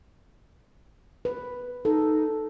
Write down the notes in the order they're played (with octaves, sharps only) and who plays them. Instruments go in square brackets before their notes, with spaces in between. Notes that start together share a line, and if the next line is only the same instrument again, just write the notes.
[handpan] B4
[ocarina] D#4 [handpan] A4